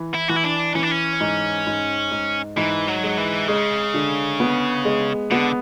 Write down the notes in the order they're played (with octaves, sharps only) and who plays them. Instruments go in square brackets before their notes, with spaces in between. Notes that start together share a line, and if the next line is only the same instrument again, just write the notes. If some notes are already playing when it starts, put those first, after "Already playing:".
Already playing: [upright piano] E3
[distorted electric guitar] E4
[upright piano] E3 [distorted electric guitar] F#4
[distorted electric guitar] E4
D4
[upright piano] E3 [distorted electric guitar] C#4
[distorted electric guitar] D4
C#4
[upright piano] G#2
G#2
G#2
[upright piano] G#2 [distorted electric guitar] E3
[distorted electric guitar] F#3
[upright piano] G#3
[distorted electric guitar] E3
[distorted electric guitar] C#3 [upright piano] G#3
[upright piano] D3
B3
G#3
[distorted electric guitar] D3 [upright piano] B3